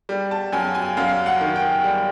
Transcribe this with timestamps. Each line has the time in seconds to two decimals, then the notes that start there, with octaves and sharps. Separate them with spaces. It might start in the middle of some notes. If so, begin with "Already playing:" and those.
0.09 G3
0.31 A5
0.52 F#2 G#5
0.75 G#5
0.97 F#2 F5
1.26 F#5
1.41 D#3
1.56 G5
1.84 G3